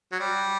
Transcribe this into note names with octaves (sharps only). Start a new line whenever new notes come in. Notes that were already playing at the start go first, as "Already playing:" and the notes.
F#3
G3